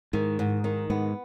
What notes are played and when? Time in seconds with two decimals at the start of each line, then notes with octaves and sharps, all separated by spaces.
0.13 G#2 D#3
0.39 G#2
0.64 D#3
0.90 G#2 B3